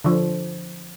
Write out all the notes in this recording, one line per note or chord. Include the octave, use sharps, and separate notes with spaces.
D3 F3